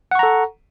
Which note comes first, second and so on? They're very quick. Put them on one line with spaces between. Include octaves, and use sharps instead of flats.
F#5 C#6 A#5 A4